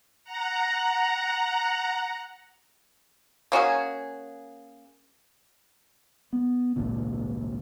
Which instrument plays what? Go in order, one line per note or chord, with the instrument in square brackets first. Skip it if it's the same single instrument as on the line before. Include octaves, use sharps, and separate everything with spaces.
[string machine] F#5 A#5
[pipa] A#3 C#4 F#4 G#4
[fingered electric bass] B3
G#1 C#2 A#2 D3